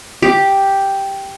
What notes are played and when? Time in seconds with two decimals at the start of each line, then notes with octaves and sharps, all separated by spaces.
0.22 G4